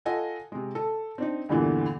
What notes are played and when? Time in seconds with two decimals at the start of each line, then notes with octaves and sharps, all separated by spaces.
0.05 F4 A4 D#5 F#5 G#5
0.52 C3 G#3
0.75 A4
1.18 C4 D4 D#4
1.49 E2 G2 A#2 D3 E3